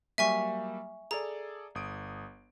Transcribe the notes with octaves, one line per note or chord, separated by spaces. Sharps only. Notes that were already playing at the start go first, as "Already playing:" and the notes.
F#3 G3 A#3 E5 G#5 C#6
G#4 A4 D5 A#5
G1 D#6 D7